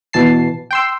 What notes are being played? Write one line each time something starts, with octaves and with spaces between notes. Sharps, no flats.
B2 E3 A5 C7
G5 C6 E6